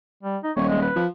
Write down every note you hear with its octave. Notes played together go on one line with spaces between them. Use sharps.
G3
D#4
D#1 C#5
G#3
B4
F3